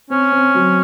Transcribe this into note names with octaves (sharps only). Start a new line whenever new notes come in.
C4 C#4
C4
F#3